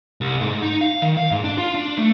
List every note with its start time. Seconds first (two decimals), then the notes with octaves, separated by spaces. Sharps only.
0.21 C2
0.41 G#2
0.62 D#4
0.81 F5
1.02 D#3
1.17 F5
1.31 G#2
1.44 D4
1.58 F4
1.75 D4
1.98 A3